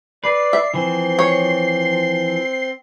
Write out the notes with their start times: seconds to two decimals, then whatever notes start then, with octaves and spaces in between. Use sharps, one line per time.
0.24 B4 D5 C7
0.53 E5
0.74 E3 F3 C4 C6
1.19 C#5